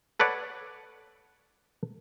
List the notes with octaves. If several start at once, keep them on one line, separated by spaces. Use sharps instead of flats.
A4 B4 C#5 D5 F#5